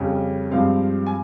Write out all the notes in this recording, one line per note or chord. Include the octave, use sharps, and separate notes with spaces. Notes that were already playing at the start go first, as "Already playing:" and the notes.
Already playing: F2 C#3 G3 C#4
G2 F3 G#3 C4 F5
G#5